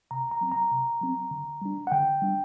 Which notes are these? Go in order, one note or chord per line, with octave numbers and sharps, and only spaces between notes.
C3 A#5
A#5
F#3 C4
A#5
C3
F#3 C4
D3
G3 D4
F#5
D3 G5
G3 D4